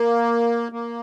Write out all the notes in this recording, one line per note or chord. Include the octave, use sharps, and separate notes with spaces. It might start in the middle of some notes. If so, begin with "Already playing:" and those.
Already playing: A#3
A#3